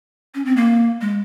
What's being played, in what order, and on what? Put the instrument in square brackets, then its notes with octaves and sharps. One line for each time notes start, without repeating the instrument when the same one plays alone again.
[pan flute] C#4
C4
A#3
G#3